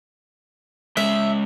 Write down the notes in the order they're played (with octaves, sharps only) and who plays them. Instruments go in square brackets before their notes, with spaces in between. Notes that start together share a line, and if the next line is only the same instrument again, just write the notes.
[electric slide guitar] C#3 G#3 [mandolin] E5